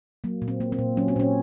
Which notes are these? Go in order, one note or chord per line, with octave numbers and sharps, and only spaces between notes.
F#3 A#3
A#2
C4
A#3
C4
A#2
F#3 C#4
C4
A#2 C#4